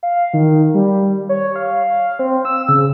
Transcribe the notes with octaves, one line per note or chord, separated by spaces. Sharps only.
F5
D#3
G3
C#5
F5
C4
E6
C#3